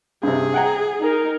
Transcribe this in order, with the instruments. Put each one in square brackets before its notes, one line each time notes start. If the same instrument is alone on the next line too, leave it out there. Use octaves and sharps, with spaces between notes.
[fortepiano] G2 C3 [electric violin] G#4
[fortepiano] F#5 G5 A#5
[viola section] D#4 A#4